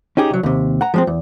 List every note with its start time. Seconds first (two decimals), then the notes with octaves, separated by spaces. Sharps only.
0.17 C#4 D#4 G4 G#4
0.31 C2 F#3
0.43 D#2 C3
0.81 F#5 A#5
0.94 F3 G#3 C4
1.07 E2